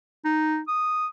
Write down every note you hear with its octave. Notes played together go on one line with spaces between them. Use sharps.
D#4
D#6